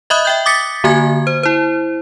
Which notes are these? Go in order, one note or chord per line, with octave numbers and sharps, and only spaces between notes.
D#5 E5 B5 D#6 F#6
E5 G5 G6
D6 D#6 A6 B6 C#7
D3 A#3 F#4 G#5 G#6
C5
E4 C5